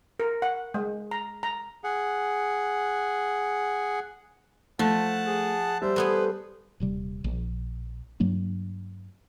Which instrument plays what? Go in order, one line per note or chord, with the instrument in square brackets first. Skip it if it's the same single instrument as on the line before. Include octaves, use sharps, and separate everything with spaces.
[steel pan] A#4
F#5
G#3
A#5
A#5
[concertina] G#4 F#5
[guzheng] F3 [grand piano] A3 [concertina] F#5 A5
[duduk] G#4
[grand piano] G3 [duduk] C5 [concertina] E5
[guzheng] A3 B3 G#4 [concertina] B4
[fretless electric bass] D#1 C3 G3
A#1
G2 F#3 A#3 D4